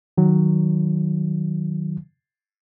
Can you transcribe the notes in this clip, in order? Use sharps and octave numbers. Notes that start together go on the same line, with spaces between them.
D#3 F#3